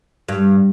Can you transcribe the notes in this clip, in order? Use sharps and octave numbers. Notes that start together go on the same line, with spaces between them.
G2